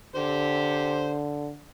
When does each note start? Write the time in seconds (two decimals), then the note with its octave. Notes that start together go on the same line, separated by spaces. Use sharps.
0.15 D3 G4 C5